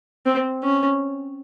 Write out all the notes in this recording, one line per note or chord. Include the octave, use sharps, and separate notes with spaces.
C4
C#4